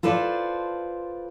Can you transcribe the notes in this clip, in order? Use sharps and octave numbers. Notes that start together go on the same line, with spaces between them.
F4 A4 B4 C5 D5